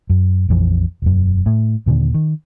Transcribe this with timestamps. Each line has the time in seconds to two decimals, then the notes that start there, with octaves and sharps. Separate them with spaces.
0.10 F#2
0.49 A#1 F2 E3
1.02 E1 F#2
1.46 A2
1.86 D#2 A#2 D3
2.14 D#3